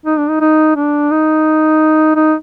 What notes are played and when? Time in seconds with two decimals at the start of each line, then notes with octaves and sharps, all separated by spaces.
0.06 D#4
0.18 D4
0.29 D#4
0.41 D#4
0.76 D4
1.11 D#4
2.16 D#4